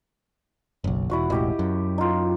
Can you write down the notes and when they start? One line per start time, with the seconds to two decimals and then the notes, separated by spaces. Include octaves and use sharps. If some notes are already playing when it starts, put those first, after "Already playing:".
0.84 F#1 B1
1.10 E1 E4 F#4 F#5
1.30 E1 A1 E4 G4 D#5
1.59 F#2
1.98 D#4 F4